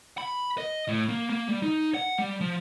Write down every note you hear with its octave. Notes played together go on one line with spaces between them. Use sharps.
B5
D#5
A2
A#3
A#3
G3
D#4
F#5
G3
F3